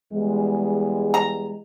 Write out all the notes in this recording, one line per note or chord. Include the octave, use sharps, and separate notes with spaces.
E2 G3 G#3
A#5